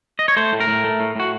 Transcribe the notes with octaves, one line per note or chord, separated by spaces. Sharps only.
D#5
C#5
A3 C5
A2
A#4
A2
A3
A2
A2 F#4